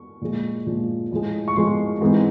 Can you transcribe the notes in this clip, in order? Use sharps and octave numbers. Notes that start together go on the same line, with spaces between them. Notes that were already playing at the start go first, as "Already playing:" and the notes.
Already playing: C#6
A#2 F3 G#3
A#2 F3 G#3
A2 F3 G#3
C#6
A2 F3 G#3 C6
G#2 E3 G#3 C4